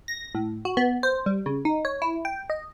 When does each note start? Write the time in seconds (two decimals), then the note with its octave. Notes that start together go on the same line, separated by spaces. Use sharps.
0.08 A#6
0.35 A2
0.65 F#4
0.77 B3
1.03 C5
1.26 G3
1.46 C#3
1.65 D#4
1.85 C#5
2.02 E4
2.25 G5
2.50 D#5